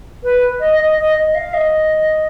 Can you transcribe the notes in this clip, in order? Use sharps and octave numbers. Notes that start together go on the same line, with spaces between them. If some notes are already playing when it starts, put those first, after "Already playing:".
B4
D#5
D#5
D#5
D#5
F5
D#5